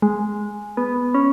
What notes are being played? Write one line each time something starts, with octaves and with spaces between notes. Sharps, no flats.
G#3
B3
C#4